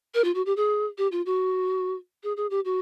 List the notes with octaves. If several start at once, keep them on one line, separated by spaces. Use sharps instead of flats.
A#4
F4
F#4
G4
G#4
G4
F4
F#4
G#4
G#4
G4
F#4